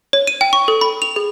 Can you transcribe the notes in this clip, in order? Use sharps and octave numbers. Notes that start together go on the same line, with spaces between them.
C#5
D#7
G5
C#6
A4
B5
F7
G#4